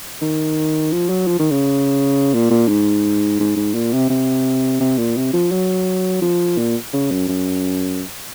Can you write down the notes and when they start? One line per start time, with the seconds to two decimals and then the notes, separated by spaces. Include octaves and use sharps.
0.22 D#3
0.92 F3
1.09 F#3
1.27 F3
1.39 D#3
1.51 C#3
2.34 A#2
2.51 A#2
2.68 G#2
3.40 G#2
3.57 G#2
3.74 A#2
3.93 C3
4.10 C3
4.80 C3
4.98 A#2
5.17 C3
5.33 F3
5.52 F#3
6.22 F3
6.58 A#2
6.93 C#3
7.11 F#2
7.28 F#2